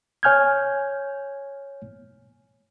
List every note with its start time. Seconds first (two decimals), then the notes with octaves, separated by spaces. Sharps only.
0.23 C#5 G#5 F6 G6 G#6